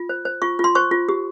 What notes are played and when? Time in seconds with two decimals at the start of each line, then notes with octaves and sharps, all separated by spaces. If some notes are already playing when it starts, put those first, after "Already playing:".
Already playing: F4
0.09 C5
0.25 C5
0.42 F4 C#6
0.59 F4
0.64 C6
0.75 C5 C#6
0.91 F4
1.09 G4